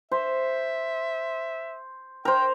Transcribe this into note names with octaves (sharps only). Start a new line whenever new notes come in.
C5 E5
A#4 C5 G5